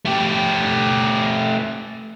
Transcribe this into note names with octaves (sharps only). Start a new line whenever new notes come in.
A3 G4